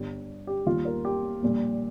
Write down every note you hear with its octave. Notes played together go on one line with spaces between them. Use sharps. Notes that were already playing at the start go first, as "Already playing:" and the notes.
Already playing: G1 G2 G3
G4
D#2 D#3 G3 F4
A#4
G4
A#1 A#2 G3